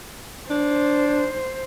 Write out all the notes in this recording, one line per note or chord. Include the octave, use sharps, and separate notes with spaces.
D4 C5